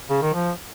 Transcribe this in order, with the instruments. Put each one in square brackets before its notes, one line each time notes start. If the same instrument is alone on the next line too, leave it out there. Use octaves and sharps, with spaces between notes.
[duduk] C#3
D#3
F3